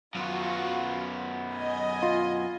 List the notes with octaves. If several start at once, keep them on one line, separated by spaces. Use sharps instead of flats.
F#2 B3 F4 F#4
D#5 G#5
F4